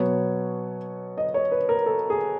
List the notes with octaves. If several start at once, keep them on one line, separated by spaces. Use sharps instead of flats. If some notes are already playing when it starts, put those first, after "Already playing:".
Already playing: B2 F#3 B3 C#5
D#5
C#5
B4
A#4
A4
G#4